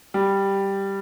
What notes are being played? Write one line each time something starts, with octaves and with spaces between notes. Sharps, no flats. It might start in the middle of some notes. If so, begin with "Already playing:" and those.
G3